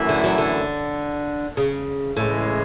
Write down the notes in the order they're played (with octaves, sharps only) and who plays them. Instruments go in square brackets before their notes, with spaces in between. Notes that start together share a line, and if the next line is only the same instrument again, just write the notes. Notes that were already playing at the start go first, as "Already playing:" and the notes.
Already playing: [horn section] F#2 E3 A3 E4
[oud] D3
F#3
D3
C#3
[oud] A2 [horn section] C#3 E3 G#3